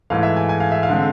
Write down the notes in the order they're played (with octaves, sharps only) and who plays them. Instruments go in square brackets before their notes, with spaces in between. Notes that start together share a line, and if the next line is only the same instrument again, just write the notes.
[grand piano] G#2 E3 A3 F5
E5
G#5
G#5
F5
E5
F5
D3 G#3 C4